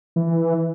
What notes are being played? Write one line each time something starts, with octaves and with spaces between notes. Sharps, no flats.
E3